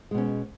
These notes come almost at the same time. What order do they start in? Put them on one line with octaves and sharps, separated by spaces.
G#3 B2 C#4